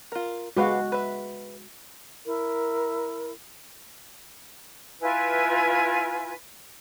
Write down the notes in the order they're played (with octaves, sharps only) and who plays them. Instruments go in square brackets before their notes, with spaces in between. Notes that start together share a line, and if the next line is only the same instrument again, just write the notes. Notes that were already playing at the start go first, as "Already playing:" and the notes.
[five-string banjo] F4 A#4
[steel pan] G#3 F#4 [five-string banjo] G4 B4 F5
[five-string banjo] B4 E5
[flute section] E4 A#4
E4 F4 B4 G#5